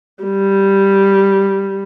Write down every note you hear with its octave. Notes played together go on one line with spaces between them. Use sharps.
G3